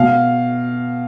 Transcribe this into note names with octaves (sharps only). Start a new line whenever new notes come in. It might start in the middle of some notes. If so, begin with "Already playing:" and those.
Already playing: B2 F5